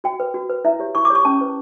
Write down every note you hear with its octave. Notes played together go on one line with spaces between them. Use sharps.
F#4 G5
B4
F#4
B4
E4 E5
G4 C#5
E4 C#6
D6
G4 C#5 C#6
C#4 A5
E4 B4